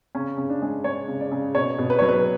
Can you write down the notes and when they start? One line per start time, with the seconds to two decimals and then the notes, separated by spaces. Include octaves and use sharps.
0.15 C#3 C#4
0.38 C#3
0.50 D4
0.62 G#3
0.84 G#3 C#5
1.08 C#3
1.21 D5
1.31 C#3
1.55 B2 C#5
1.78 B2
1.90 B4
1.99 F#3 C#5
2.09 B4